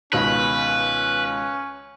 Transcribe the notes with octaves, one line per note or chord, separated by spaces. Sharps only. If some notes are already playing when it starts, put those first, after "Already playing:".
C#2 B2 D#3 C#4 B4